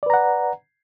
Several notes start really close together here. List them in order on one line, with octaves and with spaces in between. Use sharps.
D5 B4 A#5 F#5